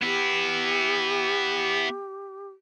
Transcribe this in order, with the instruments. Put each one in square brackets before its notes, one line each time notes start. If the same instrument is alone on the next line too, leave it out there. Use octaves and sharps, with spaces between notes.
[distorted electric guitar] B3 E4 [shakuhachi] G4